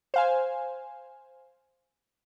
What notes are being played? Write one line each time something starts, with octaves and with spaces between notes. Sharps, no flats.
C5 F5 G#5